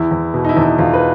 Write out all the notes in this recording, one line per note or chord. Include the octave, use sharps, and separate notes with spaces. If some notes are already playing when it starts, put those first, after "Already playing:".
Already playing: E2 E4
E2
B2
D#4
E4
E2
E4
E2 F4
B4